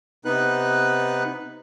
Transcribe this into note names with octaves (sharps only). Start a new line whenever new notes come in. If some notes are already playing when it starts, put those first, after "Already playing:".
C3 B3 D#4 B4 F#6